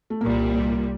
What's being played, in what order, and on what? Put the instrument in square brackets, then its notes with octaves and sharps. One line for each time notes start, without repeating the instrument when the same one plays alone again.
[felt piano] A3
[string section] C2 A#2 G3 [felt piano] A#3